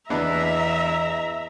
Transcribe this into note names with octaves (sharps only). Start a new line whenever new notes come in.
E2 B3 D4 D#5 E5 A#5